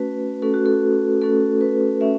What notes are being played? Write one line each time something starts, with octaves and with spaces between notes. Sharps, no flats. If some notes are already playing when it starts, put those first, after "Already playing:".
Already playing: A3 C#4 F#4 B4
A3 C#4 F#4 A4
F#4
A4
A3 C#4 F#4 A4
B4
A3 C#4 E5